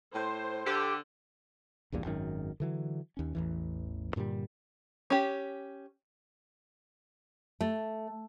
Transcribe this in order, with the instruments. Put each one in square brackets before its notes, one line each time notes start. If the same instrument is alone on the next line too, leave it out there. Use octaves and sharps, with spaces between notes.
[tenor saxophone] A2 [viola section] C5
[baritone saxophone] D3 [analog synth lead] G4 [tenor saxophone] A4
[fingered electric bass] A#1 E2 G2 A#2
G#1 F#2 D#3
D3 E3 F#3
D#2 C#4
A1 E2 E3
G2 A#2 D3 G3
[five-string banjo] C#4 G4
[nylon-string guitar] A3